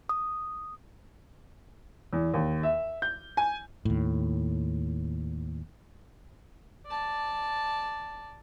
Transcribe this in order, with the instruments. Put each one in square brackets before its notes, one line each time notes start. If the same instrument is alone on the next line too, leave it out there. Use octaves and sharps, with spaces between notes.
[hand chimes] D#6
[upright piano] E2
D#2
E5
G6
G#5
[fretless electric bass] D#2 A2
[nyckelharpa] D5 A5